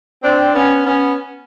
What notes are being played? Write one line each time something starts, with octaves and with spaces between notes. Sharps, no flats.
C4 D4
B3 C#4
B3 C#4